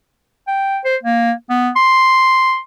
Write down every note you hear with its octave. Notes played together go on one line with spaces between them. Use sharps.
G5
C5
A#3
B3
C6